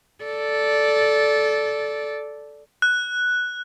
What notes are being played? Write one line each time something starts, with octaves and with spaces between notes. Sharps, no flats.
A4 D5
F#6